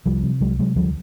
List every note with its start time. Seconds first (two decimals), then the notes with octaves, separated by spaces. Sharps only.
0.06 C2 F3 G3
0.23 C3
0.40 C2 F#3 G#3
0.59 C3 F#3 G#3
0.76 D2 F3 G3